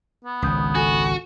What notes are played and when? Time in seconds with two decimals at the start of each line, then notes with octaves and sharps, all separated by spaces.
0.25 B3
0.42 G#1 C#2 B5 D#6 G6
0.75 F#4 A4 G#5 C#6